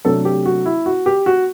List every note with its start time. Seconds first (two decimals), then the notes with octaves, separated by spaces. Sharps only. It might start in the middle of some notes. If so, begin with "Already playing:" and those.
0.05 C3 F#3 A3 D4 A4
0.25 G4
0.46 F#4
0.66 E4
0.86 F#4
1.06 G4
1.26 F#4